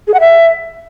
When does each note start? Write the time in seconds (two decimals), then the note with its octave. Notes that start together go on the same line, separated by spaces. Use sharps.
0.08 G#4
0.14 F#5
0.20 E5